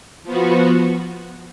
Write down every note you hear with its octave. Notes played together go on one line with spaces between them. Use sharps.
F3 B3 F#4